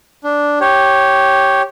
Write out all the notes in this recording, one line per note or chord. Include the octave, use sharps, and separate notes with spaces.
D4
G4 C#5